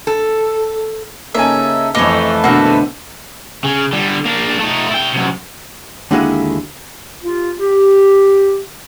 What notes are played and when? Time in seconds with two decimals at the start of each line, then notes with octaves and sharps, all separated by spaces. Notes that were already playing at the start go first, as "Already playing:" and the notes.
0.07 A4
1.35 C#3 A#3 C#4 D#4 A4 E5 G#5
1.95 F2 E3 A3 D#4 A4 B4 C#5 D6
2.44 B2 D3 A#3 C4 F#4 F#5 E6
3.64 C#3
3.93 D3 G3
4.26 A#3 D4
4.60 A3 D#4
4.90 E4 G5
5.12 F#2 C3
6.11 D#2 D3 G#3 E4 F#4 F5
7.22 F4 G4
7.59 G4